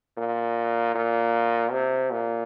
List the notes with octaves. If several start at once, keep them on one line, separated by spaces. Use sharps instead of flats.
A#2
A#2
C3
A#2